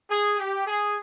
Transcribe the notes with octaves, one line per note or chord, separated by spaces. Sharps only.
G#4
G4
G#4